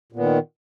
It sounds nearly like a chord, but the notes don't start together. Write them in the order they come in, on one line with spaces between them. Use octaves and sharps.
A#2 B3 D#3